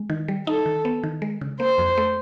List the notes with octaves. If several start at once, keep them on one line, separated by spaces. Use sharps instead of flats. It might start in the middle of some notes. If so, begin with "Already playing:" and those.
Already playing: G#3
D#3
G3
D#4 A4
D#3
B3
D#3
G#3
C#3
A#3 C5
F2
A3